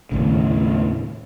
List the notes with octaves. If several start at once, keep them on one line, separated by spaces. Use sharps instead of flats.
D#2 A2 C#3